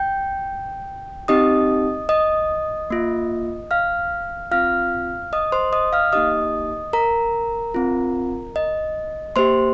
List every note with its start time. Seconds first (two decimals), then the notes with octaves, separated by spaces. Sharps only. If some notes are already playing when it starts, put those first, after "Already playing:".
Already playing: G5 G6
1.28 C4 D#4 G4 D#5 D#6
2.09 D#5 D#6
2.90 A#3 F4
3.71 F5 F6
4.51 C4 F4 F5 F6
5.33 D#5 D#6
5.52 C5 C6
5.73 D#5 D#6
5.93 F5 F6
6.13 A#3 D#4 G4 D#5 D#6
6.93 A#4 A#5
7.74 C4 F4
8.56 D#5
9.36 A#3 G4 C5 C6